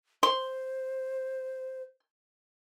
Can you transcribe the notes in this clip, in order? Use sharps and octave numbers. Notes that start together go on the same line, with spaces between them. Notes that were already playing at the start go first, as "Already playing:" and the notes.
C5 C6